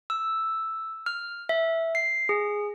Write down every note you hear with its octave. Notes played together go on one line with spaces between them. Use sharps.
E6
F6
E5
C7
G#4